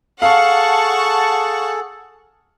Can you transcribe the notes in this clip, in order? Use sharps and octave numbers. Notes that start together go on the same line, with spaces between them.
G#4 A4 F5 F#5 A5 C#6